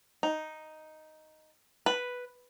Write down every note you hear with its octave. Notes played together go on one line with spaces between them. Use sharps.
D#4
B4